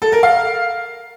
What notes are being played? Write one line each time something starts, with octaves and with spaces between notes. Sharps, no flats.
A4
A#4
F5